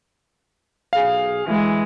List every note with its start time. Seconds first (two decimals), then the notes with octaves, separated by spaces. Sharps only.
0.93 B1 G#4 F5
1.46 D2 E3 G#3